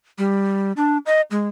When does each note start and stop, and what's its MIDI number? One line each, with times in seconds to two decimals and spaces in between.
0.18 0.72 55
0.77 0.98 62
1.06 1.21 75
1.31 1.49 56